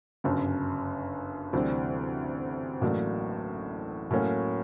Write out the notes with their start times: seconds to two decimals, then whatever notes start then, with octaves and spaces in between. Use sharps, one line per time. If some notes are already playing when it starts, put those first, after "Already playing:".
0.24 G1 F#2 C#3
1.53 D2 C3 E3 G3 C4
2.81 A1 A2 F#3 A#3 D4
4.11 A2 F#3 A#3 C#4 F#4